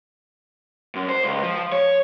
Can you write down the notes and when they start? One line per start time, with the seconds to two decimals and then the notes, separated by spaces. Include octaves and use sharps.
0.95 F#2
1.09 C5
1.24 C#2
1.43 F3
1.72 C#5